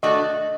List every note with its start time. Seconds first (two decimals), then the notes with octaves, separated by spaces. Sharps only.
0.03 A3 D4 F#4 A4 D#5